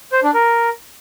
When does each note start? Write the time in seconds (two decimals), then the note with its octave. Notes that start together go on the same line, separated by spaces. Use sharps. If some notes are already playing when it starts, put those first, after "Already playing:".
0.12 C5
0.23 D4
0.34 A#4